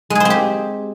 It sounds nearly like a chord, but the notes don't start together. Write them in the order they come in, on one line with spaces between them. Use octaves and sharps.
G#3 G#4 C5 C4 G4